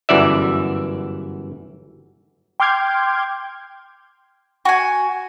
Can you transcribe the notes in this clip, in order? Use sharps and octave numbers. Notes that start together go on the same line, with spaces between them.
G1 F#2 E3 D5 E5
G5 C6 D6 F6 G6 G#6
F#4 G#5